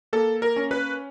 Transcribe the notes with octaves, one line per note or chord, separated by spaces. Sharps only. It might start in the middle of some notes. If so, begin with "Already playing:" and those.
A#3 A4
A#4
C#4
B4